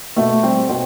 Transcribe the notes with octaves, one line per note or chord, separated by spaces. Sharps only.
B2 A3
G3 C4
B2 C4